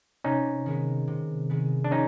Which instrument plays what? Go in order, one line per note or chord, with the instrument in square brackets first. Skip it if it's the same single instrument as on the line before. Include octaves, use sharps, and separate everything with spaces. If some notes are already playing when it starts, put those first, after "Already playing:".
[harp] C3 [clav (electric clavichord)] C#4 D#4
[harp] D#3 G#3 B3
C3
D#3 G#3 B3
[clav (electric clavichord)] D4
[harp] F3 [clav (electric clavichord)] C#4 D#4